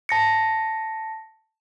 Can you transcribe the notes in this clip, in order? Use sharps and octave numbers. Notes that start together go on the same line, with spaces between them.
A5 A#6 C#7